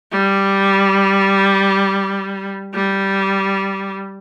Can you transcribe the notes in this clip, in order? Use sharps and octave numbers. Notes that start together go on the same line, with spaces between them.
G3
G3